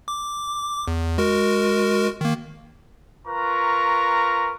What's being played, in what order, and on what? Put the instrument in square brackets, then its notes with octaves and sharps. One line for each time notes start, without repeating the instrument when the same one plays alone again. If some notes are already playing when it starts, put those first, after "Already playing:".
[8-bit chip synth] D6
E2
G#3 F#4 A#4
D#3 A#3
[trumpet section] F4 A#4 B4 A#5 C#6